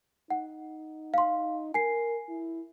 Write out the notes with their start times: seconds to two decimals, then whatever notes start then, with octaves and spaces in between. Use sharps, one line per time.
0.30 D#4 F#5
1.14 F5 C6
1.74 A#4 G#5 C7
2.29 E4